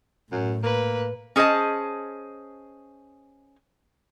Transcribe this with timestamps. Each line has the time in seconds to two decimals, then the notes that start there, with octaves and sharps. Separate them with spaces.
0.32 F#2 A2
0.64 A#3 B4
1.36 C#4 G#4 C5 D#5 A5